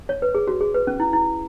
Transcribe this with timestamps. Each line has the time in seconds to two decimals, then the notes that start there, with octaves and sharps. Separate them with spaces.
0.09 C#5
0.22 B4
0.35 G#4
0.47 F#4
0.61 G#4
0.75 B4
0.87 C#4
1.00 E4
1.13 E4